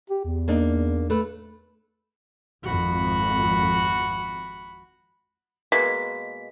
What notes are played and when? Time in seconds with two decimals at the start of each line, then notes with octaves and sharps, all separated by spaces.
0.10 G4
0.24 E2
0.48 A#3 D4 D#4
1.10 A3 B4
2.64 G#1 F2 F#4 B5
5.72 B2 G#3 A#3 B6